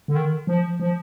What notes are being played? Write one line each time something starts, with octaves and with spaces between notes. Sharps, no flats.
D3
D#3
F3
F3